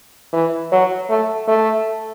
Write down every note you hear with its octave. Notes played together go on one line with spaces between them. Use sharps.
E3
F#3
A3
A3